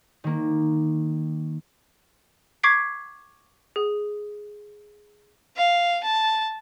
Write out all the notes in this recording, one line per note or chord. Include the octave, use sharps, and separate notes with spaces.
D#3 A#3
C#6 D6 G#6 B6 C7 D7
G#4
F5
A5